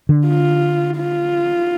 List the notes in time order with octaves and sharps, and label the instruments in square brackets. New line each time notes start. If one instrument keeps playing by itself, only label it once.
[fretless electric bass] D3
[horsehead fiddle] F4
F4